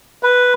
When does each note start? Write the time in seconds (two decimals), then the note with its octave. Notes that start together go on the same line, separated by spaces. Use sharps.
0.23 B4